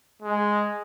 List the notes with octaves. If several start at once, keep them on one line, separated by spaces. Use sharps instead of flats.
G#3